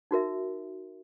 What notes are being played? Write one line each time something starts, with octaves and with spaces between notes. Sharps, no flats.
D#4 F#4 A#4 E5